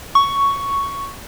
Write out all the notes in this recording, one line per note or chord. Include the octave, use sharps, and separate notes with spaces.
C#6